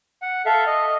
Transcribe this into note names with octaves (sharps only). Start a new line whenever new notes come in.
F#5
A4 E5 F5
D#5